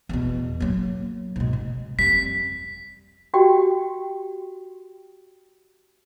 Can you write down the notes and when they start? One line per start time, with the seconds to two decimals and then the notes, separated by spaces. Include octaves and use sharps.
0.09 E2 B2
0.60 F#3 A#3
1.36 G#2 B2
1.53 G#3
1.99 F2 G3 B6
3.34 F#4 G4 G5